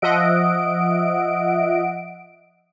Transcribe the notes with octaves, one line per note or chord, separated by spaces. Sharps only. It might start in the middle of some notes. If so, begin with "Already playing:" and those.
F3 D#5 E5 F#5 D7